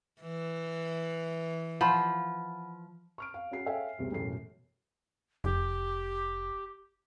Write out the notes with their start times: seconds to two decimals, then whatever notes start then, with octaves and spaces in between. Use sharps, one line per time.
0.21 E3
1.81 F3 F#5 B5 C6
3.18 C#6 F6 D7
3.34 F5
3.51 C#4 F#4 C7
3.66 A4 C#5 E5 F5 G5 G#5
3.98 G1 D2 C3 G#4
4.12 E1 A1 F#2 A4 C7
5.44 F1 G4